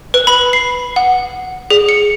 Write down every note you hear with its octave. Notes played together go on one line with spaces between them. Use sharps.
B4
B5
C7
F#5
G#4
C#7